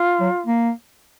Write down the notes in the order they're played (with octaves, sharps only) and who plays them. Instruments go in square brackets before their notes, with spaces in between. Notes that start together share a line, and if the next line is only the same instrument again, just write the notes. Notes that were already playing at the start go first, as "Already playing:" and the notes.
Already playing: [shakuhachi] F4
[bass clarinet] F#3
A#3